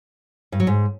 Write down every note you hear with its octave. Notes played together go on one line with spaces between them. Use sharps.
G2
F#3
G#2